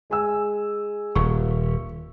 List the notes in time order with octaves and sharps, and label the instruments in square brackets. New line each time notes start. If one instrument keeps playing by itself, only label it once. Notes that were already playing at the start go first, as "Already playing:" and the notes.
[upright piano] G#3 G#5 E6
[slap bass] D#1 [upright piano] C#6